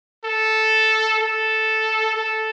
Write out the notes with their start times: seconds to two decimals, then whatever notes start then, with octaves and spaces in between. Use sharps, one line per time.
0.25 A4
1.20 A4
2.15 A4